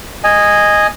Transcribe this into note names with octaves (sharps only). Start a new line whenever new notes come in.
D#5 G#5